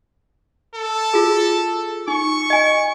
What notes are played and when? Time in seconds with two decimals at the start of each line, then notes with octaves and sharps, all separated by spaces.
0.74 A4
1.14 F4 G#4
2.08 D#4 C#6
2.50 D#5 G#5